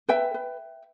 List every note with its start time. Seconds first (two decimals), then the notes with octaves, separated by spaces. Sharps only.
0.09 B4 E5 G5
0.34 B4